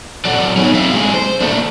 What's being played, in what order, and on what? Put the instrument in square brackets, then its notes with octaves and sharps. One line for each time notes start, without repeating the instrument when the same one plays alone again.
[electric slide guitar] F#3 F#4 A4 D5 F#5
B3 D#4 G#4 C#5
C4 E5 F5
F#3 G#3 G#4 A4
C5
A3 A#3 D4